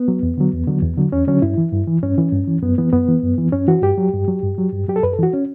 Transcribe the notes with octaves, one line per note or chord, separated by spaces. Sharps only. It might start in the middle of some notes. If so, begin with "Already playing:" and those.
Already playing: B3
F#3
E2
D3 F#3
E2
D3 F#3
E2
D3 F#3
E2 C#4
D3 F#3 C#4
G2 E4
E3
G2
E3
G2 C#4
E3
G2
E3
F#2 B3
E3 B3
F#2 B3
E3
F#2
E3
F#2 C#4
E3 F#4
G2 G4
F#3
G2
F#3
G2
F#3
G2
F#3 G4
A4
F#2 B4
A4
E3 F#4
C#4